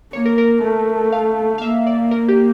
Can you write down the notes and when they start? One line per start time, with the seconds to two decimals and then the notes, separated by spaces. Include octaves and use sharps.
0.13 A#3 C#5
0.26 A#4
0.38 A#4
0.63 A3
1.13 F5
1.58 F5
1.62 A#3 E5
1.87 D5
2.11 A#4
2.28 G4